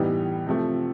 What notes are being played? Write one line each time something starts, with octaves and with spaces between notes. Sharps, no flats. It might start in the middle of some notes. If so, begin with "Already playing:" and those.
Already playing: A2 E3 G3 B3 D#4
C3 F3 A3